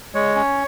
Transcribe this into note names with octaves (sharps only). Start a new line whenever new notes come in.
G#3 C#5
C#4